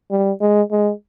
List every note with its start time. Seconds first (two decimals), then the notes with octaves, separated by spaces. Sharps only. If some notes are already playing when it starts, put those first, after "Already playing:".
0.11 G3
0.41 G#3
0.71 G#3